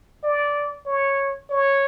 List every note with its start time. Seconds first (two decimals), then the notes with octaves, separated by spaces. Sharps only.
0.23 D5
0.86 C#5
1.50 C#5